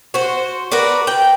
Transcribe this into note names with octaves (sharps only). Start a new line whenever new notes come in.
F#4 C5
F#4 A#4 B4 D5
G5